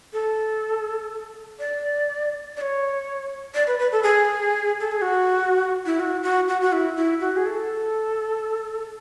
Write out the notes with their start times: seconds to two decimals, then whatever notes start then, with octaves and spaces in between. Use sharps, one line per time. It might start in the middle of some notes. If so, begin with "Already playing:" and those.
0.13 A4
1.59 D5
2.57 D5
2.61 C#5
3.55 D5
3.67 B4
3.79 B4
3.92 A4
4.03 G#4
4.80 A4
4.92 G#4
5.02 F#4
5.86 E4
6.00 F#4
6.23 F#4
6.48 F#4
6.61 F#4
6.73 E4
6.97 E4
7.21 F#4
7.37 G#4
7.46 A4